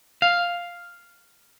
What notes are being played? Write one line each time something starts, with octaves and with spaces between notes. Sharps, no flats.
F5